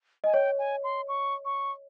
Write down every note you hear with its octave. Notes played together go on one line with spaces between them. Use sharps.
D#5 G#5
C#5 G5
G#5
C6
C#6
C#6